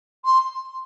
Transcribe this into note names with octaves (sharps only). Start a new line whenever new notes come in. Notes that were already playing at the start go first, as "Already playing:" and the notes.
C6